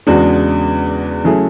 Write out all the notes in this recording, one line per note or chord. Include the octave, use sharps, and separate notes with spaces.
E2 C#3 G#3 D4 F#4
C#3 F#3 A3 E4 G#4